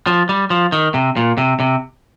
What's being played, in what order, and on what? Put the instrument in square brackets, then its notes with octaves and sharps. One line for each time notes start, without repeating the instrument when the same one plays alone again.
[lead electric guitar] F3
G3
F3
D#3
C3
A#2
C3
C3